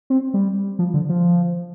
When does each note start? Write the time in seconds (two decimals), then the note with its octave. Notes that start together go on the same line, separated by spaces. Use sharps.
0.10 C4
0.34 G3
0.79 F3
0.94 D3
1.09 F3